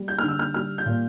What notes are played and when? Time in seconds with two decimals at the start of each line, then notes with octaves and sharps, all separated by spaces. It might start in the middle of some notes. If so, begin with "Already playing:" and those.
Already playing: G3
0.08 G6
0.18 D3 F6
0.28 E6
0.39 F6
0.54 G3 F6
0.78 G6
0.86 A#2